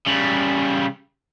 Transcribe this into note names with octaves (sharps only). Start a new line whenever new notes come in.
C#3 G3